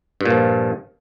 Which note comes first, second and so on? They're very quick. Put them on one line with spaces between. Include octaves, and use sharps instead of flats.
G2 A#2 F3